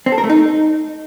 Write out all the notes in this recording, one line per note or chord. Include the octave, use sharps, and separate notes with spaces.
C4
A4
A#4
A3
D#4